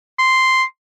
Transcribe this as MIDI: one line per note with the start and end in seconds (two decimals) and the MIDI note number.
0.19 0.63 84